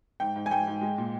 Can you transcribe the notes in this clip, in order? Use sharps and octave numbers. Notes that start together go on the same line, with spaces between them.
G#2 G5
G#2
G#5
G#2 G5
G#2
G#3
A#2